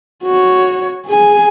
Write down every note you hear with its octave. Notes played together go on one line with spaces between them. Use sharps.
F#4 C#5
G#4 G#5